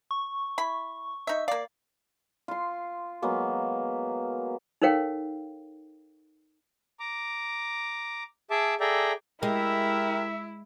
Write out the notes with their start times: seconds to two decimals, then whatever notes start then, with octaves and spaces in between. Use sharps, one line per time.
0.11 C#6
0.58 E4 B5
1.27 D#4 E5
1.48 A#3 D5 F5
2.48 F4 C6
3.22 F#3 G#3 A#3 B3
4.82 D#4 A4 A#4 C#5 F5 G5
7.00 A#5 D6
8.50 G#4 E5 A5 D6
8.80 G#4 A4 D5 E5 G5 A#5
9.43 G#3 E4 G4 A#4 E5